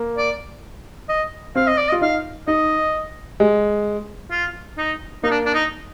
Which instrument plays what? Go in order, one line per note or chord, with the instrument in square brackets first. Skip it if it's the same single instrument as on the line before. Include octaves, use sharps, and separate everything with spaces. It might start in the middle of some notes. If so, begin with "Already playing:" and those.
Already playing: [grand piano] A#3
[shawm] D5
D#5
[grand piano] C4 [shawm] F5
[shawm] D#5
D5
D#5
[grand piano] F4
[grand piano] D#4 [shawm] F5
[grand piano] D#4 [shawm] D#5
[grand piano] G#3
[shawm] F4
D#4
[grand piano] A#3 [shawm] D#4
[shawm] D4
D4
D#4